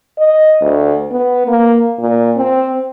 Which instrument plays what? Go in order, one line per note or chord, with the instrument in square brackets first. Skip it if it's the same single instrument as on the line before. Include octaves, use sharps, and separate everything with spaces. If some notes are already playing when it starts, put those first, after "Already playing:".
[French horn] D#5
D2
B3
A#3
A#2
C4